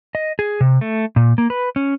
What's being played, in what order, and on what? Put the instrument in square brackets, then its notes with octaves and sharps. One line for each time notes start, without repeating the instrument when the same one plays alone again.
[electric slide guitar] D#5
G#4
C3
A3
A#2
A#3
B4
C#4